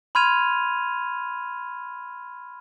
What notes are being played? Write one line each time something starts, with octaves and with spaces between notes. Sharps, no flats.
B5 C6 F6 G#6 D#7 F7